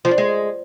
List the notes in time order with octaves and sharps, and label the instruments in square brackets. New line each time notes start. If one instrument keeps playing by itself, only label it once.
[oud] F3
D4
G#3